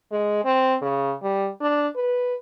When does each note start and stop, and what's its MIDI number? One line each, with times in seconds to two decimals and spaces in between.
0.12 0.41 56
0.45 0.76 60
0.82 1.14 49
1.23 1.49 55
1.61 1.88 62
1.96 2.35 71